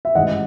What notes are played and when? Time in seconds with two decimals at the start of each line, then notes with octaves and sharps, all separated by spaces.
0.05 E5
0.15 A1 G#2 E3 D#5 F#5